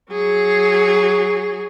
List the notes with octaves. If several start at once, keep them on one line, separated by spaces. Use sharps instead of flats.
F#3 G#4